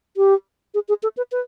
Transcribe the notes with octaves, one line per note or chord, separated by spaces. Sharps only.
G4
G#4
G#4
A4
B4
B4